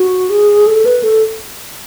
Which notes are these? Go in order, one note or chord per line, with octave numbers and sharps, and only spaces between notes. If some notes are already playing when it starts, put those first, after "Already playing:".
Already playing: F#4
G#4
A4
B4
A4